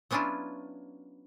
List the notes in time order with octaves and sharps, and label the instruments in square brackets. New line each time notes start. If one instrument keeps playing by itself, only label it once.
[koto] F#3 B3 C#4 D4 E4 F4